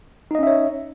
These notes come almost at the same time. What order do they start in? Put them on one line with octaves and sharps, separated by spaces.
D#4 D#5 C#4 E5 C#5